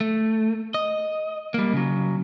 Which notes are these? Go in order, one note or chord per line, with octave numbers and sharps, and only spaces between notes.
A3
D#5
G3 A#3
C#3 F#3